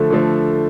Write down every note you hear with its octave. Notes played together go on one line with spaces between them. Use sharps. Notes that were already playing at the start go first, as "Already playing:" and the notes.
Already playing: D3 F3 A3
D3 F3 A3